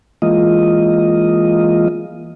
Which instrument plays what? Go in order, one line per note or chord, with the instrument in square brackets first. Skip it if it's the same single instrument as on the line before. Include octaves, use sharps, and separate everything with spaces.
[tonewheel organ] E3 G#3 A#3 F4 D#5